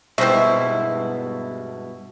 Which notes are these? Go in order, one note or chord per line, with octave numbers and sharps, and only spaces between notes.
G2 B2 G#3 B3 C4 E4 C5 E5